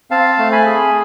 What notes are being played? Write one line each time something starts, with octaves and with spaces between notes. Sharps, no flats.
C4 F5 A5
A3
G#5 B5
G#4